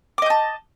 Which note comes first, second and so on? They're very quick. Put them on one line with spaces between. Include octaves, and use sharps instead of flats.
D6 D#5 G6 A5